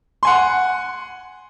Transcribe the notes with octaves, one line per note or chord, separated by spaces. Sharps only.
F#5 G#5 C6